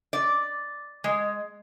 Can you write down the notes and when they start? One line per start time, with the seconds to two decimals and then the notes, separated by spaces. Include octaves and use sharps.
0.13 D5
1.04 G#3